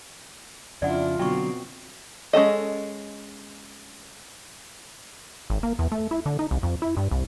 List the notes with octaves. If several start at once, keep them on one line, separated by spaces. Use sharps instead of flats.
F2 C#3 D4 E4 F4 D5 F#5
B2 D3 F#3 C4 G5 C#6
G#3 C#4 A4 D#5
G#1
A#3
E2
A3
E4
D3
D#4
C2
F2
E4
G2
C2